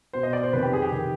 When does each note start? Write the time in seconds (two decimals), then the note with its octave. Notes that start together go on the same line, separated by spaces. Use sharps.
0.13 B2 C5
0.23 D#5
0.33 D5
0.43 C5
0.53 F2 D#3 B4
0.63 G4
0.73 G#4
0.82 G4
0.92 D#3